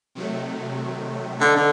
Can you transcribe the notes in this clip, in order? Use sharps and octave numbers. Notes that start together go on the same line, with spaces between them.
C3 D#3 F#3 A3
D3 B3 D#4
D3